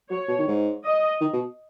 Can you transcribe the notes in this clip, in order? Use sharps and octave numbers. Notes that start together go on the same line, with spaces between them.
F#3 C#5
B2
D#3
G#2
D#5
D#3
B2